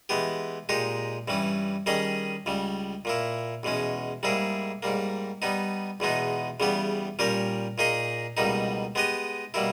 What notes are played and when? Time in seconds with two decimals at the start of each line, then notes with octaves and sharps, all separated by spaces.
0.09 E3 G#3 B3 G4
0.69 A#2 G#3 D#4 G4
1.28 G2 E3 G3 C#4
1.86 D#3 G3 C#4 G#4 D#5
2.46 C#2 C#3 G3
3.05 A#2 A#3 E4
3.63 E2 B2 G#3 C#4
4.23 G#2 G3 A#3 E4 G#4
4.83 G#2 G3 A#3
5.42 G3 B3 D#4
6.00 E2 B2 G#3 B3 D#4
6.60 E2 C#3 G3 B3 G4
7.19 A#2 G3 C#4 G4 A#4
7.78 A#2 A#3 D#4 G#4 D#5
8.37 C#2 B2 G3 A#3 D#4
8.95 G#3 B3 G4 B4 D#5
9.54 B2 G3 A#3 E4